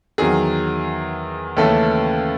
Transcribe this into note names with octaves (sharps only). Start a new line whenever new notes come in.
E2 D#3 F#3 G#4
D#2 C#3 E3 A3 C#4 A4